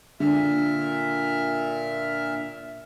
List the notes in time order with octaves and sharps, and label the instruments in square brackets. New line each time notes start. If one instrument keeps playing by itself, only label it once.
[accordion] A#2 E5 F6 [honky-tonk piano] D3